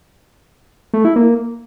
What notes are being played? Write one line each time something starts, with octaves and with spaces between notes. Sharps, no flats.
A3
E4
A#3